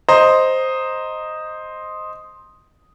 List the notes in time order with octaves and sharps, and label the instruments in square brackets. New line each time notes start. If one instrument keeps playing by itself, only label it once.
[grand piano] C5 D#5 A#5